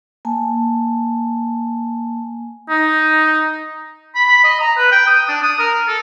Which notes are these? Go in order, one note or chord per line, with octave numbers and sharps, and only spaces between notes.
A#3 G#5 A5
D#4
B5
B5
D#5
A#5
B4
G5
D#6
D4
D#6
A#4
A4